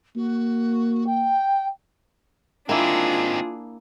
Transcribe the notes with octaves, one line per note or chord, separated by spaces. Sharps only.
A#3 F#4
G5
D#3 A#3 C4 D4 E4 F4 G#4